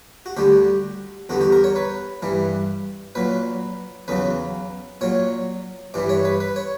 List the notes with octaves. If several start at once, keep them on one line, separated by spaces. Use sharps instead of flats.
F#4
D2 D3 G3 G4
E2 D3 G3 F#4
G4
A#4
C#5
B4
G2 E3 G3
A#2 F#3 B4
E2 C#3 F#3 B4
A#2 F#3 C#5
G2 E3 G3 D5
C#5
B4
B4
C#5